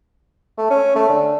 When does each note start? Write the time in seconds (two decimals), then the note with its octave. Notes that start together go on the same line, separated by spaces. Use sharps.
0.58 A3
0.70 C#4
0.95 A3
1.09 D3